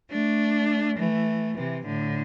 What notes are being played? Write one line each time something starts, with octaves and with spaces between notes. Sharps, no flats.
A3 D4
E3 A3
C3 E3
A2 D3